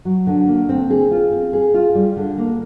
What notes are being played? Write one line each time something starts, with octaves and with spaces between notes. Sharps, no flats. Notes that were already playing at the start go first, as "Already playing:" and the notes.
F#3
D3
A#3
C4
G#4
F4
C4
G#4
F4
G3
D3
A#3